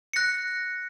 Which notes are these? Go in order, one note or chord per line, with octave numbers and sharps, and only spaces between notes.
F#6 A#6 C#7